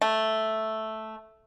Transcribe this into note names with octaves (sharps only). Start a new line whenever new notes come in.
A3